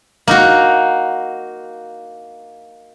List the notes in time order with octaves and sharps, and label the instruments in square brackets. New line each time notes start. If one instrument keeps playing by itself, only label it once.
[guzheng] A#3 D#4 F#4